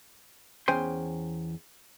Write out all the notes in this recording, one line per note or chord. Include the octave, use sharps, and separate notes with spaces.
E2 C#4 C5 G5 G#5 C6